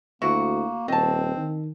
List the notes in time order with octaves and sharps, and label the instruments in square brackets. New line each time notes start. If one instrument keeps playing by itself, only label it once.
[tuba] D2 [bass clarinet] A#3 [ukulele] E4 [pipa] F#4
[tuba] D#1 [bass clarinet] C4 [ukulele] D#5 A5
[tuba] D#3